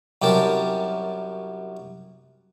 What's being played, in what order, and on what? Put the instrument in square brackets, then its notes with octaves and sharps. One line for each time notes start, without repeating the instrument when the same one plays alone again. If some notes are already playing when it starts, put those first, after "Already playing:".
[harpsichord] C2 F#2 G4 A#4 A5